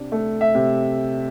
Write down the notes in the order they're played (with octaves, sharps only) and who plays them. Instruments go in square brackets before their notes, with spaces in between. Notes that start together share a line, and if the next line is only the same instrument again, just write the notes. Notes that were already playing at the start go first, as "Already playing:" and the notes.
Already playing: [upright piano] C3 D4
A3
E5
C3